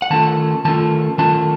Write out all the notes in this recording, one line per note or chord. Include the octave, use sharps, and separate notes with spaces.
F#5
D#3 A3 C#4 F4 A5
D#3 A3 C#4 F4 A5
D#3 A3 C#4 F4 A5